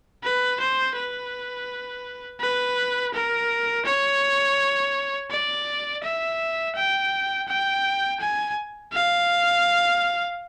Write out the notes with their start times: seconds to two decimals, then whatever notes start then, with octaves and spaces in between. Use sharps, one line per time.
0.23 B4
0.60 C5
0.96 B4
2.40 B4
3.14 A#4
3.86 C#5
5.31 D5
6.04 E5
6.76 G5
7.48 G5
8.20 G#5
8.93 F5